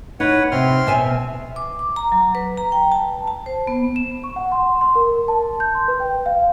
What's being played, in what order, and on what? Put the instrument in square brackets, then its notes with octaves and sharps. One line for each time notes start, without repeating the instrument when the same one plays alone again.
[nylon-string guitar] D#4 [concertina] B4 C#5 F#5
[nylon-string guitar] C3 [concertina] C4 C6 F6
[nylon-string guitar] B2 E5 G#5
[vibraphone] D6
D6
A#5
F#3
B4
A#5
G5
A5
A5
C5
B3
[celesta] E7
C#6
F#5
C6
C6
A#4
A5
G6
C6
B4
G5
F5